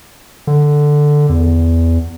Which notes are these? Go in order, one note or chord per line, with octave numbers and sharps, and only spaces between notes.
D3
E2